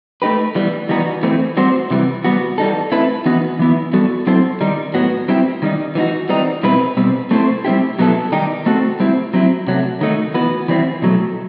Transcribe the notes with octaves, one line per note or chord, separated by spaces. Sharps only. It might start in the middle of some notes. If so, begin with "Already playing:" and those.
A3 D#4 G4 B4
E3 G3 B3
E3 G3 B3 D#4 F#4
E3 A3 C4
G3 C4 F#4 C5
C3 E3 G3
G3 B3 F#4
E3 G3 D#4 A4
A3 C4 E4 B4
E3 B3 D#4 F#4
E3 B3 E4
G3 B3 F#4 A4
F#3 C4 E4 A4 C5
D#3 G3 D#4
A2 F#3 B3 F#4
G3 C4 E4 G4
D#3 G3 D#4
E3 G3 B3 D#4 F#4
E3 G3 C4 D#4
B2 G3 C4 E4 B4
B2 G3 C4
A3 C4 E4 A4 C5
G3 C4 E4 G4
B2 F#3 B3 E4 A4
D#3 G3 D#4 G4
A3 C4 F#4 A4
G3 C4 E4
F#3 C4 E4
C3 F#3 A3
D#3 F#3 A3 D#4
E3 B3 F#4 B4
E3 G3 C4 E4
B2 F#3 A3